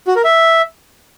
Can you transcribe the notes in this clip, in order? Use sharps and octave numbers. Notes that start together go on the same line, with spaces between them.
F#4
A#4
E5